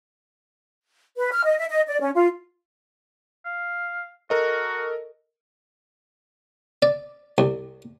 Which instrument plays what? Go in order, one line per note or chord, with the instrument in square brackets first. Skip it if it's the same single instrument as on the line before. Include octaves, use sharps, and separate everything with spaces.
[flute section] B4
F6
D#5
E5
D#5
D5
C#4
F4
[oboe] F5
[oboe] F#4 [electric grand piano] A4 A#4 D#5
[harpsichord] D5
C2